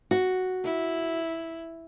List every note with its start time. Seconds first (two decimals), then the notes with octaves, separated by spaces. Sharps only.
0.11 F#4
0.64 E4